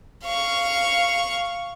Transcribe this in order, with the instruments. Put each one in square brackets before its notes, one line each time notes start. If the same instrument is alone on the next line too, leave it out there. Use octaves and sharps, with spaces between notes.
[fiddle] F5 C#6